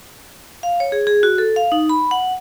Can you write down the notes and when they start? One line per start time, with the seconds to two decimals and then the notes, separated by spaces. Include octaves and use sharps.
0.63 F5
0.80 C#5
0.92 G#4
1.07 G#4
1.23 F#4
1.38 A4
1.56 F5
1.72 D#4
1.89 B5
2.11 F#5